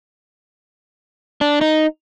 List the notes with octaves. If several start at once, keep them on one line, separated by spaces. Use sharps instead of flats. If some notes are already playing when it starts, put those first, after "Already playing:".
D4
D#4